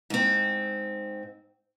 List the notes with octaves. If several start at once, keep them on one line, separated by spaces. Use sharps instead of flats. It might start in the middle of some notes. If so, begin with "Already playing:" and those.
G#2 C4